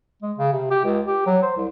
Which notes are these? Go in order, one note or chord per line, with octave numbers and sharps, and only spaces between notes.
G#3
C#3
C3
G4
C#2
G4
F#3
C5
C2